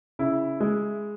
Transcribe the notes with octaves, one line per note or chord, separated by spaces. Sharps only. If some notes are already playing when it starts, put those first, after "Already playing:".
C#3 E4
G#3